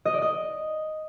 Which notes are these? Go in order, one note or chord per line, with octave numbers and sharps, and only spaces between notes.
D#5
D5
D#5